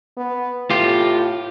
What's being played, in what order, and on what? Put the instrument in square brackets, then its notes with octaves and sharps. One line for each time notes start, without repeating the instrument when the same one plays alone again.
[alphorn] B3
[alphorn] A2 [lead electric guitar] F4 G4